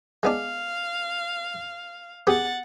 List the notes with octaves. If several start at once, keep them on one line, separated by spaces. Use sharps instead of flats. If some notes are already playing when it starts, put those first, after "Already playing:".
G#3 B3 D4 F5
B3 G4 G#4 F#5 A6